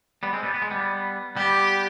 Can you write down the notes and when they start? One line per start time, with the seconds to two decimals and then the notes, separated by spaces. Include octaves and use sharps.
0.23 G3 B3
0.33 G#3 C4
0.43 G3 B3
0.54 B3
0.62 G#3
0.70 G3 B3
1.36 G3 B3 G4